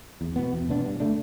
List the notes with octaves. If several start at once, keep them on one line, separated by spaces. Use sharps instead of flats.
E2
B2 B3
E2
B2 B3 D4
G2
D3 A3 D4